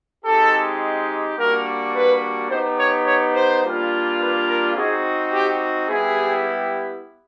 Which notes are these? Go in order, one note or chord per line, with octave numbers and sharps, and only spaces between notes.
G#3 C4 D#4 G4 A4
G3 A#3 D4 F#4 A#4
B4
B3 D#4 G4 C5
C#5
C#5
C5
G3 A#3 D4 F4
B4
A#4
C4 D#4 F#4 G#4
G4
G3 B3 E4 G4 G#4